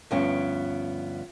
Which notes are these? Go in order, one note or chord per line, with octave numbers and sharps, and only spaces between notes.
D2 G2 F3 B3 C#4 G5